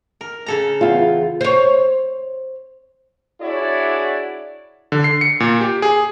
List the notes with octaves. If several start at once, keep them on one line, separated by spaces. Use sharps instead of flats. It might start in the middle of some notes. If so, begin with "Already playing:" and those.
A#4
C#3 A4 A#5
E2 F4
C5 C#5
D4 E4 F#4 G#4 C#5 D5
D3
C7
C#7
A#2
G4
G#4